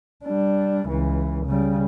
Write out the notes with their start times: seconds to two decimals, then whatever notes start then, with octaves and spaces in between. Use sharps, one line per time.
0.25 G3 D4
0.88 C#2 E3
1.46 C#3 G3